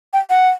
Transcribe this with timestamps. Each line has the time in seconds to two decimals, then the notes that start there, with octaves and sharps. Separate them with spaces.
0.13 G5
0.30 F#5